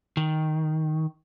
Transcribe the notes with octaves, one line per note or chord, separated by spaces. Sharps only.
D#3